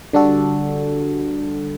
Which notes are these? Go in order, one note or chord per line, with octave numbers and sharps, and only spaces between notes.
D3 G3 D4 F#4 A4